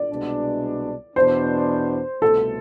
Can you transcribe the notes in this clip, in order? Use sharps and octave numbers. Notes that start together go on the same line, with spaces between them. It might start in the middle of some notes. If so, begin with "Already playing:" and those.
Already playing: D5
C2 B2 G#3 D4
E2 B2 B3 D4 C5
C2 B2 A3 A4